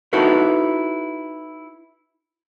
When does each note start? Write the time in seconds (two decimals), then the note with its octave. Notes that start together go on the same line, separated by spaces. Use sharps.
0.13 D#4 E4 F#4 A4 B4